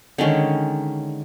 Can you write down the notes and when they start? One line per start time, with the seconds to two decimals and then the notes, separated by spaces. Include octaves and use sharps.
0.18 D3 D#3 G#3 C#4